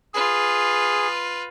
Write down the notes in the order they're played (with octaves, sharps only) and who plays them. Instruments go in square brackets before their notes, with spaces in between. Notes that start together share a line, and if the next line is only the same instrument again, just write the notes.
[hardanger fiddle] F4 B4 [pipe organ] G#4